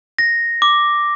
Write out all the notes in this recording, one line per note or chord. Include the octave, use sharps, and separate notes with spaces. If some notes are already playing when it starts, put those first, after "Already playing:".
A#6
D6